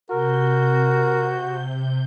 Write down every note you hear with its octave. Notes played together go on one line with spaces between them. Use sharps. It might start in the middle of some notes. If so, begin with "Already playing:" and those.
C3 F#4 A#4 G6